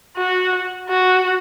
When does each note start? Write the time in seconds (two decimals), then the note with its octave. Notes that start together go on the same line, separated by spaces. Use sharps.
0.17 F#4
0.89 F#4